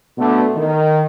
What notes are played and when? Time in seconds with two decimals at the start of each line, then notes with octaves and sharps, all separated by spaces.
0.18 B2 D3 A3 B3
0.56 D#3